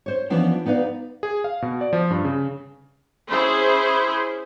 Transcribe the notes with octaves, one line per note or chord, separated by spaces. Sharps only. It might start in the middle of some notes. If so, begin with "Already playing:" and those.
C5 C#5
E3 F3 B3 C#4 D4 F4
B3 D#4 B4 D5 F5
G#4
F5
B2
D5
F3
G2
C#3
C#4 E4 G#4 C5